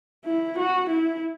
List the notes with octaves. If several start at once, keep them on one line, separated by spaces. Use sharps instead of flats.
E4
F#4
E4